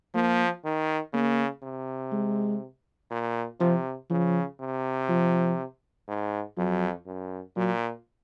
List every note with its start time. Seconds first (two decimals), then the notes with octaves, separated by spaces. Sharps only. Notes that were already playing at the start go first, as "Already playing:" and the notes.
0.15 F3 A#3
0.65 D#3
1.14 C#3 A#3
1.63 C3
2.12 G#3
3.11 A#2
3.60 C3 F3
4.10 C#3 F3
4.60 C3
5.09 F3
6.08 G#2
6.57 F2 F#3
7.07 F#2
7.56 A#2 F#3